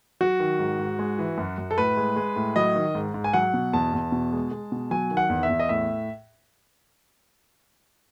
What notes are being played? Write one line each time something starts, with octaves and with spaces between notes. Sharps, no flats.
F#3 F#4
D#3
G#2
G#2
G#3
E3
F#2
F#2
A4
A2 B4
G#3
G#3
A2
F#3 D#5
D#3
G#2
G#2
G#5
F#3 F#5
B2
E2 A5
E2
B2
G#3
G#3
B2
F#3 G#5
D#3
F#5
E2
E5
E2
D#5
A2 E5